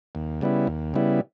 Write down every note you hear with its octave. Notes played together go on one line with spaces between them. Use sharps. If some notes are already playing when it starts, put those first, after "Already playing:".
D#2
C#3 G3 B3 E4
D#2
C#3 G3 B3 E4